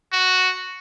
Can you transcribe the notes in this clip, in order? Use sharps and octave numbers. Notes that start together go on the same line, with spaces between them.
F#4